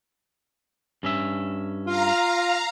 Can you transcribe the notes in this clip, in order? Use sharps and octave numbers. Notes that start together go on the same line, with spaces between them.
G2 C#4 E5
F4 F5 A#5